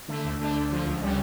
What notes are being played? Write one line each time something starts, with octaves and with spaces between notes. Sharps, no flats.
D3 A3
D2
D3 A3 D4
D2
D3 F3
C#2
C#3 G3